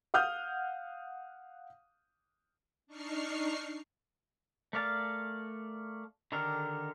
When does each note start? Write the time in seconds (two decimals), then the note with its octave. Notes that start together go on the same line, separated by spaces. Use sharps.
0.14 F5 F#5 D#6 F6 G6
2.87 D4 D#4 C#6 F6 C7
4.73 A3 A#4 D5 F5 A5
6.32 D3 D#3 G4 A4 A#4